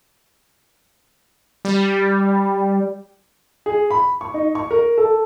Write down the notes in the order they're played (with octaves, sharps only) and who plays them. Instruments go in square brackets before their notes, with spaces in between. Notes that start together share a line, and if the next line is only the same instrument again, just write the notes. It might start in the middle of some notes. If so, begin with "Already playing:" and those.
[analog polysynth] G3
[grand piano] G#4
B5
C#6
D#4
C#6
A#4
A4